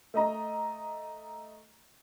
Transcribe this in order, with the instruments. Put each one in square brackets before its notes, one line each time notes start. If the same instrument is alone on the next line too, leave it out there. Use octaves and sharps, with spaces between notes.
[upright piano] A3 D#5 A#5